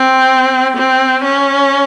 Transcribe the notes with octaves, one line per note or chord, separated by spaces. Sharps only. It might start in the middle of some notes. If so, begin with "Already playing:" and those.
Already playing: C4
C4
C#4